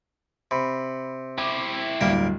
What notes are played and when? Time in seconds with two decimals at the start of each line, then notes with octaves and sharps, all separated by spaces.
0.51 C3 B5
1.38 E4 G4 D6
2.01 D1 G2 G3 A#3 A#4